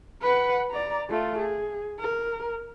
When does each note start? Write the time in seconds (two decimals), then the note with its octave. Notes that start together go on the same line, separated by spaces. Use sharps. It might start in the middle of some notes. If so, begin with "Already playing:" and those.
0.22 B4 F#5
0.71 D5 A#5
1.09 A3 F4
1.39 G#4
1.99 A#4